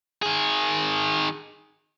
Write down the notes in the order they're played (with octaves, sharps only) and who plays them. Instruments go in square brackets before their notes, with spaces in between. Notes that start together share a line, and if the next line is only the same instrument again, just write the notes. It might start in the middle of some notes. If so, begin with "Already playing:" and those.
[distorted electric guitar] D#3 G#4